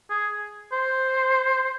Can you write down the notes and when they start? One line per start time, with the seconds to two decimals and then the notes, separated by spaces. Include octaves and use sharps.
0.10 G#4
0.72 C5